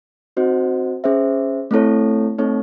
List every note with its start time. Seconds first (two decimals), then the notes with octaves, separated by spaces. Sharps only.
0.37 C4 D#4 F#4 C5 D#5
1.04 C#4 G#4 C5 E5
1.71 A3 C4 E4 A4 C#5
2.38 A3 C4 D#4 A4 C#5